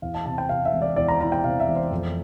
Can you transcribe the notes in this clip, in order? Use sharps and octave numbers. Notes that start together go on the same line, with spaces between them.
E2 F5
A5
C3 A5
G5
C3 F5
E5
E1
D5
E2 D5
A#5
E3 A#5
G5
C3 F5
E5
E1
C5
F2